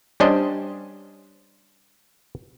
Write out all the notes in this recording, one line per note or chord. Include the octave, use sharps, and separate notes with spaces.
G3 C#4 D4 C5 D#5